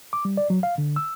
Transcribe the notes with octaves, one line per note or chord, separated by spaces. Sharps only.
D6
G3
D5
F#3
F5
D3
E6